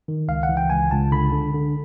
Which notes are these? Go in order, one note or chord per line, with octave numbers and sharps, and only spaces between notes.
D#3
C#2 F5
F#5
E3
G5
C#2 G#5
C#2 A5
D3 B5
D3
D3